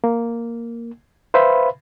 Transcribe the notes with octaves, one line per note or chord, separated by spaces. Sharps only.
A#3
B4 C5 E5 F5 B5